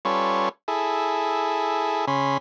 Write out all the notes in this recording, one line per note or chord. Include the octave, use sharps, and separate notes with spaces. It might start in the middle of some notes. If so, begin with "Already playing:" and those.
G3 C#4 F4 A4 B4 C#5
E4 G#4 A4
C#3 C#4 B5 C6